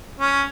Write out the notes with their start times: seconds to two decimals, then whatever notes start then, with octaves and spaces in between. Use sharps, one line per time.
0.20 C#4